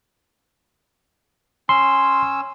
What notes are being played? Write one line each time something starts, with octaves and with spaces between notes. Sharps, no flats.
C#4 C6 E6